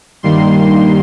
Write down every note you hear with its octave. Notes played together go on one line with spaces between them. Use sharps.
G2 D#3 G3 A#3 C6